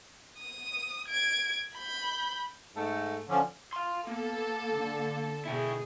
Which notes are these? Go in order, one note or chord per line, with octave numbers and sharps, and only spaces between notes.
D#6
G#6 D7
B5 G6
G#2 A3
D3 F3 C#4
F5 C6
A#3 B3 A4
D3
B2 E4 G#4 G5